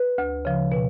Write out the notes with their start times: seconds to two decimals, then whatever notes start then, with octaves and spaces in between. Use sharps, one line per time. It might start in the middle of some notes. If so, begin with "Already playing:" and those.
Already playing: B4
0.18 D2
0.45 C#3 F3
0.72 B2